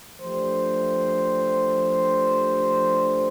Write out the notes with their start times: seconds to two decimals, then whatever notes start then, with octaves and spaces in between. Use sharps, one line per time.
0.22 F3 A3 D4 G4 C5